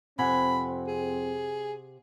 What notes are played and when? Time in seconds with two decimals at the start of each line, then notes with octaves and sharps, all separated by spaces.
0.19 F2 C3 C4 F#5 G#5 B5
0.87 G#4